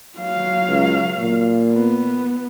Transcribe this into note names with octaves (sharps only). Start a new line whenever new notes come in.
F#3 F5
C#2
A#2
B3